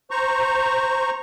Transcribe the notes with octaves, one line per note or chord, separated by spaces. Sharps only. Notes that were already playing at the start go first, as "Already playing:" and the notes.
C5 A#5 C#6